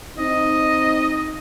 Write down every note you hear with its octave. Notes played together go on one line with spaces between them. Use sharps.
C4 D#4 D#5